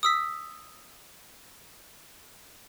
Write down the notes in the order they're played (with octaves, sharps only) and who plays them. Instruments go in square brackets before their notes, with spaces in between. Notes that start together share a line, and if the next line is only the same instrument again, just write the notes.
[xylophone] D#6 E6 B6